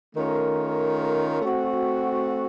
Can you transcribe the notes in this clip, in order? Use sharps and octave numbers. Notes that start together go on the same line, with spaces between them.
D#3 A3 C#4 F4 A#4
A3 C4 F#4